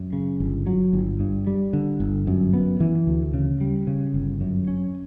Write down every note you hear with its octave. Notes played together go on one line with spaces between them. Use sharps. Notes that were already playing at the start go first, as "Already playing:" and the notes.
Already playing: F#2
C#3
G1
F#3
G1
G2
G3
D3
G1
F#2
B3
E3
D2
C#3
G3
C#3
G1
F#2
C#4